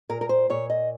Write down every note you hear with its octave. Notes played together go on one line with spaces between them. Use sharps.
A#2 A#4
A#4
C5
A#2 C#5
D#5